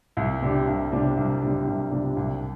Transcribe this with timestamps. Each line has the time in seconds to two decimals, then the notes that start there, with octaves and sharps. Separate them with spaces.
0.17 C2
0.41 C3 G3 D4
0.67 C2
0.92 C3 G3 D4
1.17 C2
1.42 C3 G3 D4
1.67 C2
1.91 C3 G3 D4
2.17 C2